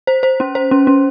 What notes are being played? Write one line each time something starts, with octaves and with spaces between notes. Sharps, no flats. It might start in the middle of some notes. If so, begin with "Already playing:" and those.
C5
C5
C#4
C5
C#4
C#4